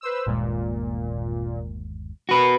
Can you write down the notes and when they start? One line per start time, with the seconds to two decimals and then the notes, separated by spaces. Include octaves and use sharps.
0.01 B4 C5 E6
0.26 G1 D#2 A#2 G#3
2.29 F#4 A#4 B4